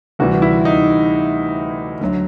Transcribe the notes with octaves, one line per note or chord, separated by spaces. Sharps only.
D2 C3 E3 G3 F#4
E4
D#4
D2 D3 F#3